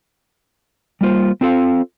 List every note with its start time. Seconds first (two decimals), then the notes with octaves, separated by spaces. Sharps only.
1.01 G3 A#3 F4 C5
1.41 C4 D4 F4 A4 C5 F5